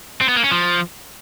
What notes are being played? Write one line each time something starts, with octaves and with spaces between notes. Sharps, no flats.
C4
B3
A#3
C#4
F3